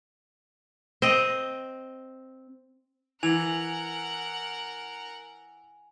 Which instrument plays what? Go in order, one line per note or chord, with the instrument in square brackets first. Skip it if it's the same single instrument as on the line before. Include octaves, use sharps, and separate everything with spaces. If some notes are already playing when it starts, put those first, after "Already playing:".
[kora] C4 D#5
[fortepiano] E3 [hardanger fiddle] A#4 F#5 [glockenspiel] G#5 F7